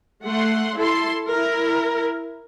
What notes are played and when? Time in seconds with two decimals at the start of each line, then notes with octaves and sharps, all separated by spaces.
0.23 A3 F#5 C6
0.77 E4 A4 C6
1.28 E4 A#4